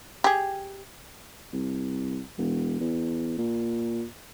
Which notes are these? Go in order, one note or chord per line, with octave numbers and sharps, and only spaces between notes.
G4 G#4
C2
E1
E2
A#2